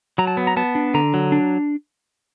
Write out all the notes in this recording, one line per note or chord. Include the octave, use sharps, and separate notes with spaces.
F#3 A#5
A5
B3
A#5
B3 A5
D4
D3 A#5
F#3
D4